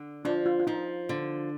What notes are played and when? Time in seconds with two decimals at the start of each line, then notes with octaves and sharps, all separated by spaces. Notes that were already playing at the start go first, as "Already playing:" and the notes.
Already playing: D3
0.25 F3 D4
0.46 F4
0.60 F4
0.67 F3 D#4
1.09 D3